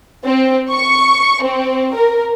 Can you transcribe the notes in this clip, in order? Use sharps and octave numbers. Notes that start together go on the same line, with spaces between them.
C4
C#6
C4
A#4